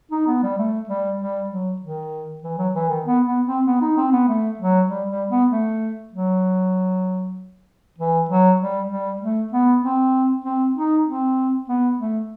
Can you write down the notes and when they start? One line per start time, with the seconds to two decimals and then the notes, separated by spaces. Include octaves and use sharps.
0.12 D#4
0.27 B3
0.43 G3
0.58 A3
0.89 G3
1.20 G3
1.50 F#3
1.82 D#3
2.44 E3
2.58 F#3
2.75 E3
2.89 D#3
3.05 B3
3.26 B3
3.46 C4
3.67 B3
3.81 D#4
3.97 C4
4.12 B3
4.28 A3
4.59 F#3
4.89 G3
5.10 G3
5.30 B3
5.51 A3
6.13 F#3
7.98 E3
8.29 F#3
8.60 G3
8.90 G3
9.21 A3
9.53 B3
9.83 C4
10.44 C4
10.75 D#4
11.06 C4
11.69 B3
11.99 A3